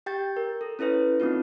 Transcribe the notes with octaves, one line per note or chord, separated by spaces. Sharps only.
G4 G5 G6 A6
A#4
A4
C#4 E4 A4 B4 C#5
A#3 C4 D#4 F4